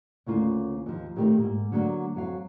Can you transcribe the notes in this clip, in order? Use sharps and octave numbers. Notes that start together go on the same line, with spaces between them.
D2 C#3 A#3 F4
D#2 F3
A#2 D#3 A3 G4 A4 A#4
G#2 A#3
D3 F#3 G#3 A#3
F2 F#3 F5